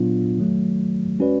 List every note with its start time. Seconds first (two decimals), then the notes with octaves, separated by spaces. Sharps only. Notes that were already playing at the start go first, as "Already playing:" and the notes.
Already playing: A#2 F#3 B3 D4 F4
0.38 D#3 F#3 A3
1.19 G#3 C#4 F#4 B4 D5